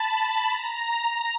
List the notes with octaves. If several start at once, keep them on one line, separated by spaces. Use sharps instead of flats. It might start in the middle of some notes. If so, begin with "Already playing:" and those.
Already playing: A5 B5
B5
A#5
A#5